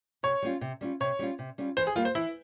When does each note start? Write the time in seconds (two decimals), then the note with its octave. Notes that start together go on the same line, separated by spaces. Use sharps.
0.23 C3 C#5
0.42 G3 C#4 F4
0.61 C3
0.81 G3 C#4 F4
1.00 C3 C#5
1.19 G3 C#4 F4
1.39 C3
1.58 G3 C#4 F4
1.77 E3 C5
1.87 G#4
1.95 G3 A#3 F4
2.05 C5
2.15 E3 E4